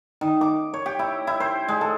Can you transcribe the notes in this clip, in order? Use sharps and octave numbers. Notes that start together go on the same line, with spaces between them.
D#3
D6
C#5
G4
E4
E4
C5
G#3
A4